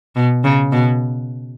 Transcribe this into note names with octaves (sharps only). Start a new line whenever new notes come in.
B2
C#3
B2